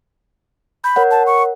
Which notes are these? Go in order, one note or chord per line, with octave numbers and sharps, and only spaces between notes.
B5 G6
A#4 C#5 F#5
A5
C#6